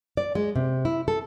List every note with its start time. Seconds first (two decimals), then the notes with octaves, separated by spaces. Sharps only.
0.17 D5
0.35 G#3
0.56 C3
0.85 E4
1.08 A4